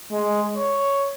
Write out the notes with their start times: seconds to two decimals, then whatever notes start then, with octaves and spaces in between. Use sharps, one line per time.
0.11 G#3
0.56 C#5